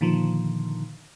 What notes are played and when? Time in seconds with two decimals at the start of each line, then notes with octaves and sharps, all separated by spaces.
0.01 A#2 D3 D#3 F3